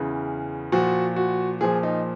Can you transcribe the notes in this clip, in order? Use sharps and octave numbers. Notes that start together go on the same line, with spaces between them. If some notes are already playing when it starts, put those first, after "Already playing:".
Already playing: E2 C#3 E3
A#2 F3 F#4
F#4
A#2 F3 G#4
D#4